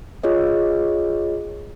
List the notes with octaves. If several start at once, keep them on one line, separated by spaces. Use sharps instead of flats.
F4 G#4 C#5 D#5